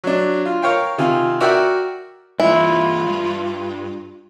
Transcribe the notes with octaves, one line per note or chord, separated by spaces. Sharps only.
F#3 D4
F4
A#4 C#5 F5 G5
C3 D#3 F4 G#5
F#4 A#4 D5 E5 F#5 G5
G2 E3 E4 F4
G2